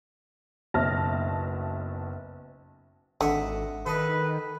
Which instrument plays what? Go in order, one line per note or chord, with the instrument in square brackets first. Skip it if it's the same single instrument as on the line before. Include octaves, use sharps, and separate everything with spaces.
[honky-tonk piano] F#1 B1 E5 A5 F6 A#6
[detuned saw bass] G#1 [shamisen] D3 [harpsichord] D#5 E5 F#5
[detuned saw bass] D#3 [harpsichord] A4 D#5 [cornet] B4